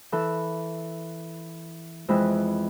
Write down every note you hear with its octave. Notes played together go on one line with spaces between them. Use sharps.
E3 A4
F2 E3 G#3 C4 E4